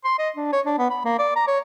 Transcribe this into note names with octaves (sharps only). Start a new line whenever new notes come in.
C6
D#5
D4
C#5
D4
B3
B5
A#3
D5
A#5
C#5